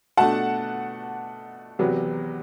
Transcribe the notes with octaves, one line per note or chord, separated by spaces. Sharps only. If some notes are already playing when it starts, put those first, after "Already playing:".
B2 A3 D4 F#5 A5
E2 C3 F#3 B3